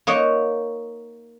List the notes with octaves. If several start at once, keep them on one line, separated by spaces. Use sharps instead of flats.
A#3 D#4 C#5 F#5